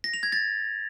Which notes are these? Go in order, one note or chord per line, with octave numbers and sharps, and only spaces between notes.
A#6
F7
G#6
A6